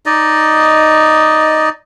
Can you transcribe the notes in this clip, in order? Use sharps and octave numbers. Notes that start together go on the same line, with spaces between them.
D#4 D5 D#5